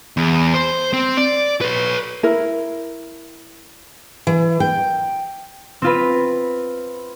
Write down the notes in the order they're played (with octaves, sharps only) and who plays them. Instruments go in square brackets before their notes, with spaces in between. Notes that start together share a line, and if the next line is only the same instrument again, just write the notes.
[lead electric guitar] E2
C5
C4
D5
B4 C#5
[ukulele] E4 A#4
[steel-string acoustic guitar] E3
G5
[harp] C4 F4 B4